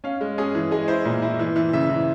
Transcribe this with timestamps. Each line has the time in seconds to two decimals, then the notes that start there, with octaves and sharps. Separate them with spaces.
0.04 C#4 F5
0.21 G#3
0.38 C#4 G#4
0.55 E3
0.71 G#3 G#4
0.88 E4 C5
1.05 A#2
1.22 E4
1.39 E3
1.56 E3
1.73 C#3 E5
1.89 E3